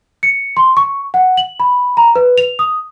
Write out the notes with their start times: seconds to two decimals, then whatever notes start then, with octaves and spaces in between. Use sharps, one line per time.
0.23 C#7
0.57 C6
0.77 C#6
1.14 F#5
1.37 F#7
1.60 B5
1.97 A#5
2.16 B4
2.38 F7
2.59 D#6